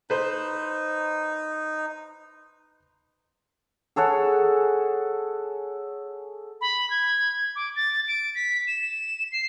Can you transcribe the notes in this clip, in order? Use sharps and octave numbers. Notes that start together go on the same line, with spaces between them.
D#4 B4 C5
G#4 A4 C#5 F#5
B5
G#6
D6
A6
D7
B6
E7
C7